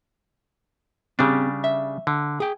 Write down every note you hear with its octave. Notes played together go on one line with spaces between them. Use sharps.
C#3 G3 C4 D4 G4 G#4
E5
D3
G#4 G5